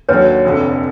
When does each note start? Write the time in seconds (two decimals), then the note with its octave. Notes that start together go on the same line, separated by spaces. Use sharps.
0.09 D#2 D3 F#3 B4 C#5
0.44 F1 F2 D3